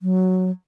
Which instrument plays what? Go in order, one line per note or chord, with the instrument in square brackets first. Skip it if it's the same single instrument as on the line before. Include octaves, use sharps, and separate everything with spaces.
[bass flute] F#3